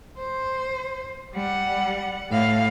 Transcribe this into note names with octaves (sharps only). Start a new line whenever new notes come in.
C5
G3 F#5
A2 F5